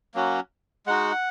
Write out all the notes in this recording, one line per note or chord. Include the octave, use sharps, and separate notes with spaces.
F#3 A#3 C#4 F#4
G#3 D#4 F#4 F#5